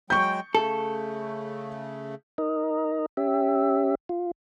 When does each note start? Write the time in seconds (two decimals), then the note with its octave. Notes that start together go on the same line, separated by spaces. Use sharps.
0.10 F#3 G#3 G5 C#6 G6
0.55 C#3 A3 A4
2.38 D#4 A#4 D#5
3.17 C#4 G4 E5
4.09 F4